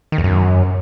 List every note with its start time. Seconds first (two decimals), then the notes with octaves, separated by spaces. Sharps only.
0.12 D#3
0.18 E2
0.24 F#2